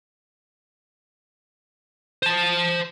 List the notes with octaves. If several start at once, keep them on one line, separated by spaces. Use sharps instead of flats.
C5 A5